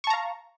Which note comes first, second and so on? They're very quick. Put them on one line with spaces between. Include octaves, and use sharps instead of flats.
C#6 A5 A#5 F5